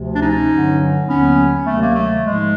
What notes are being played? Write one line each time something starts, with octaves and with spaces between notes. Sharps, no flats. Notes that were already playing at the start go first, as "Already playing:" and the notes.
Already playing: D2 C3 F3
D4
C#4 D#4
G2 D3 F#3
D#2 D3 F#3 B3 C#4
D2 C3 D#3 F#3 A3
G#3 A#3
A3
G#2 F3 G#3